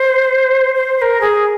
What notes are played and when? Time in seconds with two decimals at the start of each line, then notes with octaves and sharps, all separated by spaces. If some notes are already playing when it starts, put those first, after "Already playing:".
Already playing: C5
0.75 C5
0.97 C5
1.02 A#4
1.21 G#4